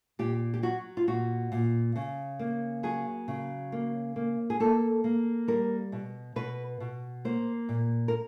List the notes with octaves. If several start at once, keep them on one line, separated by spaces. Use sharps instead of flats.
A#2 G4
G4
F#3 F#4
F4
A#2 F#4
A#2
C#3
A#3
F#3 G#4
C#3
A#3
A#3
G#4
A#3 A4
A#3
G3 A#4
B2
B2 B4
B2
A#3 C5
A#2
A#4